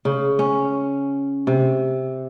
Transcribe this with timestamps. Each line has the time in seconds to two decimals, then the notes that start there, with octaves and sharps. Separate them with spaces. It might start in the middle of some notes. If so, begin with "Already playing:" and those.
0.05 C#3
0.39 C#4
1.47 C3